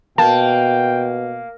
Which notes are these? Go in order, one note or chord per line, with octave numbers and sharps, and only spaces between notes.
B2 A#3 G5 A5